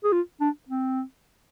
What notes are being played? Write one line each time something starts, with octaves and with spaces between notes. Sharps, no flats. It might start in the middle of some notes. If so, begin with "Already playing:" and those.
G#4
F4
D4
C4